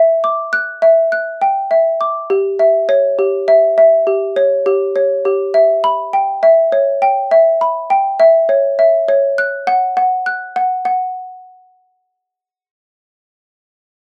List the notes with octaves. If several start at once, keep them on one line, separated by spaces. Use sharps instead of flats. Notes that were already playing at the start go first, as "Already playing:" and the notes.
Already playing: E5
D6
F#6
E5
F#6
G5
E5
D6
G4
E5
C#5
G4
E5
E5
G4
C#5
G4
C#5
G4
E5
B5
G5
E5
C#5
G5
E5
B5
G5
E5
C#5
E5
C#5
F#6
F#5
F#5
F#6
F#5
F#5